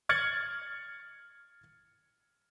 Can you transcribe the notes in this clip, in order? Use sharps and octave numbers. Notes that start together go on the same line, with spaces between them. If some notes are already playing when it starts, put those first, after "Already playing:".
F6 G#6 A6 C#7 F#7